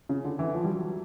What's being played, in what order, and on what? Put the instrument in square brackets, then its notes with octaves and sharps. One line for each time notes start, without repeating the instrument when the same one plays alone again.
[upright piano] C#3
D3
E3
F3
G3
F#3